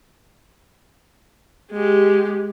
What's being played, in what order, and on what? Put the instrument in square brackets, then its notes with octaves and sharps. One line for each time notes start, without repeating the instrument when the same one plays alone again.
[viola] G#3 G4